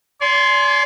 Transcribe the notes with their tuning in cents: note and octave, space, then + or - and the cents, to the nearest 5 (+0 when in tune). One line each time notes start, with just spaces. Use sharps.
D5 -40 G#5 +25 C6 +0